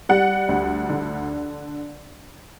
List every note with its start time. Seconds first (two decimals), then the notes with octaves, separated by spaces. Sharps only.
0.09 G3 F#5
0.49 D2
0.89 D3